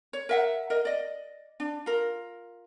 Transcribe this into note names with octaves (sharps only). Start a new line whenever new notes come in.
C#5
A#4 E5 F#5
A#4 D#5
D5 D#5
D4
F4 A#4